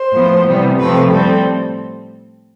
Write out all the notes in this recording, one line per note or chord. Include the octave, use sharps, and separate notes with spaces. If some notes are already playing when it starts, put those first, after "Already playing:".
Already playing: C5
A2 F3 B3
C3 E3 G3 B3
C3 F3 A3 C4 B4
A2 G3 C4 A4